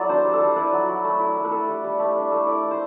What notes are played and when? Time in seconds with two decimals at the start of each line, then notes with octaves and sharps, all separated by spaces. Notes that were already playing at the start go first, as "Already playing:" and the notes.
Already playing: F#3 E4 A4 D5
0.09 D4 C5
0.25 G3
0.34 A4
0.41 G3
0.56 E4 B4
0.73 F#3
0.88 F#3
1.04 A3
1.20 E4
1.36 A3
1.45 B4
1.51 E4 A4
1.68 G3
1.84 G3
1.99 A3 G4
2.16 D4
2.31 A3
2.46 E4 D5
2.63 A3
2.71 C5